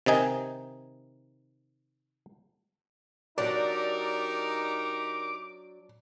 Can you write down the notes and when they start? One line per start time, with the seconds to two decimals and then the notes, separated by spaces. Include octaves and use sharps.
0.06 C3 D#3 D#4 G#5
3.38 F#3 D4 D#4 G4 A#4 D5 D6